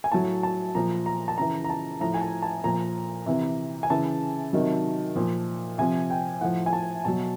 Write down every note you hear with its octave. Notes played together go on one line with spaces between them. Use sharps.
G#5
A2 F#3 A5
A5
A#2 F3 A#5
A#5
A5
C#3 E3 A#5
A#5
A5
A2 F3 A#5
G#5
A5
A5
A#2 F3 A#5
C3 E3
G#5
C#3 E3 A5
C3 D#3 F#3
A#2 F3
C3 F3 G#5
G5
A2 F3 F#5
G#5
A5
B2 F#3 A5